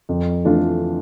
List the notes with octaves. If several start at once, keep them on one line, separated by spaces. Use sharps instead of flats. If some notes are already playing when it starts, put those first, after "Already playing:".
F2
E3 A3 D4 F4